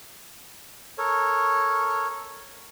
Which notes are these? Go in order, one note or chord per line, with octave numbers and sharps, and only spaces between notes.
A4 A#4 C#5